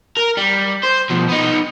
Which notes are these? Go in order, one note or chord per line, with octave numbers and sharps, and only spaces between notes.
A#4
G3
C5
B2 F3
B3 D#4